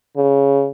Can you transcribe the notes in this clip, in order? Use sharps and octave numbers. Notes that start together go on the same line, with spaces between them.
C#3